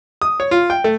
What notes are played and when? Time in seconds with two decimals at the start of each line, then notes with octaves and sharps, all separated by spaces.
0.22 D#6
0.40 C#5
0.51 F4
0.70 G5
0.84 A3